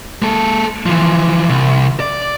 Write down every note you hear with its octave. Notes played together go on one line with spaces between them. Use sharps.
G#3 A4
E3 F3
C2
D5